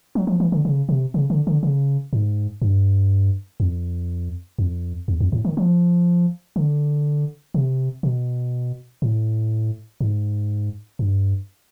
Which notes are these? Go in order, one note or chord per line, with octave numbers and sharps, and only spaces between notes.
F#3
F3
E3
D3
C#3
C3
C#3
D3
D3
C#3
G#2
G2
F2
F2
E2
F2
A2
D#3
F3
D3
C3
B2
A2
G#2
G2